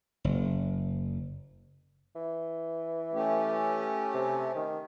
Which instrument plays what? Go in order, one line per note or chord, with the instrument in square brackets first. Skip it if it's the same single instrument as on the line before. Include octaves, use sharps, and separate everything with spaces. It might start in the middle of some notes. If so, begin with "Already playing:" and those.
[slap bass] F#1
[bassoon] E3
[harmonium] A3 C#4 G4
[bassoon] C3
D#3